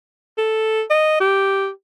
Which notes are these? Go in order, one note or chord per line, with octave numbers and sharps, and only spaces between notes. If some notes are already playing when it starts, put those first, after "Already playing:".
A4
D#5
G4